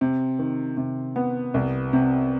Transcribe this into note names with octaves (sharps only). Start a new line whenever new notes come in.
C3
D#3
C3
B3
C2
C3